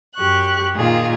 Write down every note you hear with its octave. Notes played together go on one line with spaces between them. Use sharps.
F#2 G4 C#6 F#6
A#2 D#3 F4 G#4